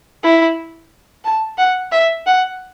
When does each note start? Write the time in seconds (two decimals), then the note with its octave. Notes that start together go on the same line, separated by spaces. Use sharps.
0.23 E4
1.24 A5
1.58 F#5
1.92 E5
2.26 F#5